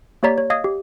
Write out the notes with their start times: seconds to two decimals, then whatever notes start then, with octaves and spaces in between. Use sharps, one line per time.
0.23 A#3 G4 C#5 D5 A#5 B6
0.38 C#5
0.50 D#5 F5 D#6 G#6
0.64 G4